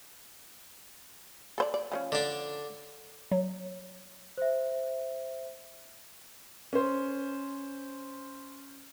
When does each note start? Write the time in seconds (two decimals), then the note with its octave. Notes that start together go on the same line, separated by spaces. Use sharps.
1.58 A4 C5 D5
1.74 D5
1.92 F3 B3 C#4
2.12 D3 D4
3.31 F#3
4.38 C5 E5
6.73 C#4 C5